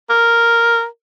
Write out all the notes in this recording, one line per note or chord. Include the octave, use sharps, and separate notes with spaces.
A#4